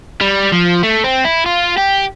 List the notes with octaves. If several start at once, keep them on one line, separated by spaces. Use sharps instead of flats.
G3
F3
A3
C4
E4
F4
G4